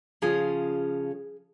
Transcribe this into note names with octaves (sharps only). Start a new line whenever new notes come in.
C#3 F3 C#4 F4 G#4